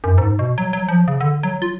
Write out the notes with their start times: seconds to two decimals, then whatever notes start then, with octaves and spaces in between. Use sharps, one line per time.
0.04 F#2
0.18 G#2
0.39 B2
0.58 F#3
0.73 F#3
0.88 F3
1.08 C#3
1.21 D3
1.43 F#3
1.62 F4